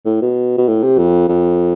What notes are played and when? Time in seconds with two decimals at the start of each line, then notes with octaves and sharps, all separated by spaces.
0.06 A2
0.21 B2
0.58 B2
0.68 A2
0.83 C3
0.98 F2
1.29 F2